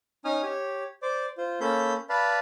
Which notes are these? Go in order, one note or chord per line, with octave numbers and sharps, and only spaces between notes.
C#4 D#4 G#5 D#6 F6
G4 C#5
C5 D5 D6
F4 C5
A#3 C#4 A4 B5 G6
B4 D5 F5 A5 B5